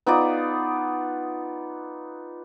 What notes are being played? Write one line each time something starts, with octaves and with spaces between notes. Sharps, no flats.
B3 D#4 F4 D5